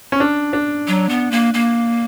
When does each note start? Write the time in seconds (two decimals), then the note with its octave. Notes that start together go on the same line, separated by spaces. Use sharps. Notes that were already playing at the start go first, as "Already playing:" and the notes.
0.12 C#4
0.20 D4
0.53 D4
0.87 F#3
1.09 B3
1.31 A#3
1.54 A#3